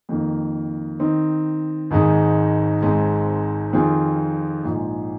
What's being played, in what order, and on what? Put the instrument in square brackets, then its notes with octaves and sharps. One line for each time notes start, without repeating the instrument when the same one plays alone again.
[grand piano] F2 D#3 A#3
D#3 C4 D#4
G#1 G#2 D#3 G#3 D#4
G#1 G#2 G#3 C4
F2 D#3 C4 F4 G#4
A#1 G#2 F3 G#3